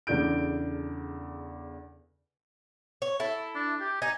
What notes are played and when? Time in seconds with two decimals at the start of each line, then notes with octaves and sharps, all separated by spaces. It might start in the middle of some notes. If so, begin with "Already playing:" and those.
0.07 E2 C#3 D4 A4 G6 D7
3.02 C#5
3.20 E4 A4
3.55 D4
3.81 G4
4.02 D#4 G#5